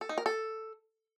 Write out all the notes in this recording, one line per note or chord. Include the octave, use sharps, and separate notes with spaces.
A4
D#4
A#4
A4